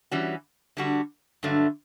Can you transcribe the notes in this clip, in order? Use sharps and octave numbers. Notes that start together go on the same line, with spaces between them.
E3 G3 C#4 F#4
D3 G3 D4 F#4
G2 D3 F#3 A3